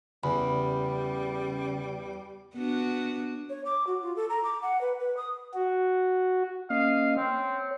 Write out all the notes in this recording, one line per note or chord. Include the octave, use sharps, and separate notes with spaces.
E2 C#3 G3 B5
B3 D4 F#4
C#5
D6
F#4
F4
A4
A#5
D6
F#5
B4
B4
D#6
F#4
A#3 C#4 D#5 F5
C4 C#5